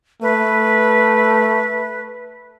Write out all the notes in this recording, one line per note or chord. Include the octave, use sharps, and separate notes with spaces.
A3 B4